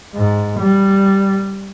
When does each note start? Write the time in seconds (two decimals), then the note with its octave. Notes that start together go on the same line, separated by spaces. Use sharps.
0.15 G#2
0.59 G3